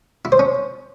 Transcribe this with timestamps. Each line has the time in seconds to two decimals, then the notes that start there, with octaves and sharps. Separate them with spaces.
0.25 E4
0.32 C5
0.39 C#4